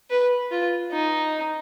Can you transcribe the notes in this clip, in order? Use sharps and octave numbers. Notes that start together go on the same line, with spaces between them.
B4
F4
D#4